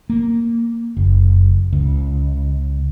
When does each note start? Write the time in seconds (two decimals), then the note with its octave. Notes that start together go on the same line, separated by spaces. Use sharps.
0.10 A#3
0.97 F#1
1.73 C#2